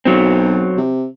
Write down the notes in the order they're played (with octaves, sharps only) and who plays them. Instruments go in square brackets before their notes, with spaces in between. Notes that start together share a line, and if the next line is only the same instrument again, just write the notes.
[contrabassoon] B1 [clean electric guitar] F#3 C4
[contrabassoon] C3